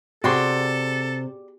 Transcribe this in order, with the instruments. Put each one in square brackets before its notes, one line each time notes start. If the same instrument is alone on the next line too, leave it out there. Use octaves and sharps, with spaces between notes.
[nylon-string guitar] C3 [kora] F#4 G#4 [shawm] A4 [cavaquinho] D5 G5 C6